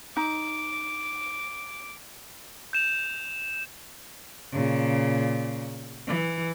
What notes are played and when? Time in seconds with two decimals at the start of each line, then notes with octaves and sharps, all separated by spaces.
0.17 D#4 D6
2.73 G6 E7 F7
4.52 A#2 C#3
6.07 E3